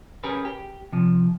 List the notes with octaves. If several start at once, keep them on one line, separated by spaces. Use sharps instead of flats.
C#4 G4 G#4 A#4 B4
G4
C3 F3